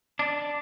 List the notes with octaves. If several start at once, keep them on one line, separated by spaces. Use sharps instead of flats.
D4